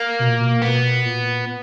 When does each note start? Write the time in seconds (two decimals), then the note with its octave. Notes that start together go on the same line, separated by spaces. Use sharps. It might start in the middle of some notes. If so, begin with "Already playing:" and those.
Already playing: A#3
0.19 B2
0.29 A#2
0.40 B2
0.55 A#2
0.62 B2 B3
1.05 A#2